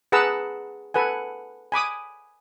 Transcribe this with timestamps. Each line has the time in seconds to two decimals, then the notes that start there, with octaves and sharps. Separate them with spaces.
0.12 G#4 B4 F#5 A5 A#5 E6
0.94 A4 B4 F#5 G#5
1.72 G#5 B5 D6 D#6